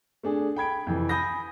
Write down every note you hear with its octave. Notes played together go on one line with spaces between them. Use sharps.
A3 D4 G#4
G5 B5 G#6 D7
F2 C3 E3
G#5 B5 D#6 G6 A#6